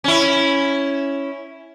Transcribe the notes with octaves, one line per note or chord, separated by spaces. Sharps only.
C#4 E4